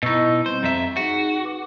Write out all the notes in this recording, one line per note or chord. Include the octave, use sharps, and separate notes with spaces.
B2 D#4 E4 C#6 E6
G3 C4 C5
F2 E5 A#5
D#4 F#4 G#4
B4 D6